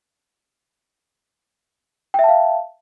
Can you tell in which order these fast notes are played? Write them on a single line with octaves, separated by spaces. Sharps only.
G5 E5 A5 F5